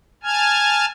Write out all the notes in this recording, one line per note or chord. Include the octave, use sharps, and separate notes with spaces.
G#5 A5 F6 G#6